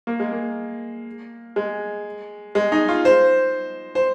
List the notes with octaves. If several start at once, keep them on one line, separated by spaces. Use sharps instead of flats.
A#3
G#3
A#3
G#3
G#3
D#4
F4
C5
C5